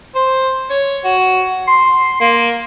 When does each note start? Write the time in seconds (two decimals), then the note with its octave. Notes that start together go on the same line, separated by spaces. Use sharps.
0.15 C5
0.70 C#5
1.04 F#4
1.67 C6
2.21 A#3